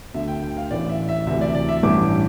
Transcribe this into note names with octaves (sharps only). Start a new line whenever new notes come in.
D2 D3 E5
G5
G5
F5
A1 A2 E3 D5
E5
E5
D2 C3 E3 E5
D5
D5
E5
A1 G2 E3 D6